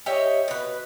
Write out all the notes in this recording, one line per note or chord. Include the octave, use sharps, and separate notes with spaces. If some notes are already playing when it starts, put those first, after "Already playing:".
G4 C#5 D#5 E5
B2 B4